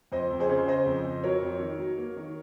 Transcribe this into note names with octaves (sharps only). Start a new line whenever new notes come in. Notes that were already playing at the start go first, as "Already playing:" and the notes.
F2 C5 D#5
F2
G#4 C5
C#3
C#3 C5 D#5
F2
F2
F#3 A#4 C#5
F2
D#3
F#3
A#3
D#3